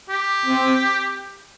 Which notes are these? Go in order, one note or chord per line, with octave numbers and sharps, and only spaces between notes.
G4
C4